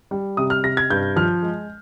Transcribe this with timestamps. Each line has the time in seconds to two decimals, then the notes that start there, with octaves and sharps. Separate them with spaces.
0.11 G3
0.37 C3 D#6
0.50 F6
0.64 C3 A#6
0.77 G#6
0.90 G2 G6
1.16 F3 F6
1.43 G#3